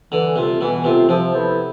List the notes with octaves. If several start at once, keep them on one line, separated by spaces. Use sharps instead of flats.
D3 E3
C3 A3 C4 F4
B2 E3
C3 A3 C4 F4
C3 F3
B3 E4 A4 C5